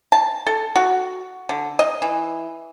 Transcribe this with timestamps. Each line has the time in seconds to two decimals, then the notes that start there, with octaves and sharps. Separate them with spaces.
0.12 A5
0.46 A4
0.76 F#4
1.49 D3
1.79 D#5
2.02 E3